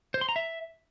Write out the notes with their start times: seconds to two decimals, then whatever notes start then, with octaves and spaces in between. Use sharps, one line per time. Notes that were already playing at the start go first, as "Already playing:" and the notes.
0.14 C5
0.21 C6
0.29 A#5
0.36 E5